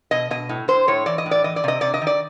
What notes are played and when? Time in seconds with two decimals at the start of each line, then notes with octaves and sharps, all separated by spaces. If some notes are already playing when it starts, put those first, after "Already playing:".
0.11 B2 D#5
0.31 B2 D#5
0.49 A2
0.68 A2 C5
0.87 A2 C#5
1.06 E3 D5
1.18 D#5
1.26 A2
1.31 D5
1.44 E3 D#5
1.56 D5
1.64 C3 D#5
1.81 C3 D5
1.94 D#5
2.02 D#3
2.07 D5